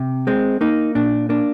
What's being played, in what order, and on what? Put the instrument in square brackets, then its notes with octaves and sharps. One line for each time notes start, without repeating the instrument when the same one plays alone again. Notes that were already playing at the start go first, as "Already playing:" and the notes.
Already playing: [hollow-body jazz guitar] C3
G#3 C4
A#3 D#4
A#2 D4
A#3 D4